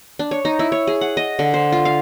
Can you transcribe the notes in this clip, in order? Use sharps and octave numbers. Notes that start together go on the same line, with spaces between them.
D4
C#5
D#4
E4
C#5
G#4
F#5
D#5
D3
C5
F4
F5